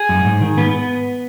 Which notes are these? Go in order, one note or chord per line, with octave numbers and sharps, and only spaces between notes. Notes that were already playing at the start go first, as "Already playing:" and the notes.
Already playing: G#4
F#2
G#2
D#3
G#2 B3